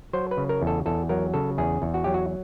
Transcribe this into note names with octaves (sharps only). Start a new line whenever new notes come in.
F#3 C5
B4
C#3
A#4
E2
A4
E2 A4
F#3 A#4
C#3 A4
E2 G#4
E2
F#4
F#3 G4
F#4